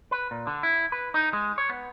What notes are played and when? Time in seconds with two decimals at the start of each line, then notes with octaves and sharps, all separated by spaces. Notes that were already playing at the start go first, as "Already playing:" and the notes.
0.11 B4
0.31 A#2
0.47 D3
0.63 E4
0.92 B4
1.14 D#4
1.33 G#3
1.58 C#5
1.70 B3